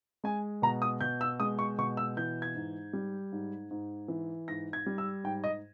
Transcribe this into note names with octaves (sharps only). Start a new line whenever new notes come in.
G#3 G#5
B2 A#5
D#6
B2 G6
E6
G#3 D#6
C#6
B2 C#6
E6
E3 G6
G#6
G#2
G3
G#2
G#2
E3
G#2 A#6
G#6
G3
E6
G#2 G5
D#5